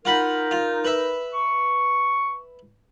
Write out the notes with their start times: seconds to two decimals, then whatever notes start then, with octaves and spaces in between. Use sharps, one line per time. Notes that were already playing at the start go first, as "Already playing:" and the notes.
0.05 D#4 F4 A#4 F#5 B5
0.51 F4
0.85 B4 E5
1.34 C#6